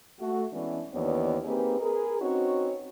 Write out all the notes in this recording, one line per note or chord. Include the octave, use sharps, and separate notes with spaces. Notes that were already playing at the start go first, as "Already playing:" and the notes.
A3 F#4
E3 G#3 B3 C#4 D4
D#2 E3 B3 D4 C#5 D5
A#3 C4 D#4 G4 G#4 B4
G#4 A#4 B4
C4 C#4 D#4 F#4 B4 C#5